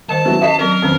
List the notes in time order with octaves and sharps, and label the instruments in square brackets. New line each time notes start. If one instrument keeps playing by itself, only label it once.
[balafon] D#3 G3 C5 [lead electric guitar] A5
[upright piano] E3 F#3 [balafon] C#4
[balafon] F#4 [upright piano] D#5 B6 C7
[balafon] F#3 C4 [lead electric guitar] A#4
[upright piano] F2 C#4 [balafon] D#3 C4 B4